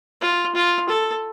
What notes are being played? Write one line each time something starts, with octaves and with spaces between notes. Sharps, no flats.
F4
F4
A4